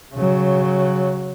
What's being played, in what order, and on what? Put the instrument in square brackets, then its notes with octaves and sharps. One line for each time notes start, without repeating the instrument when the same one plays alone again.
[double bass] C#3 F#3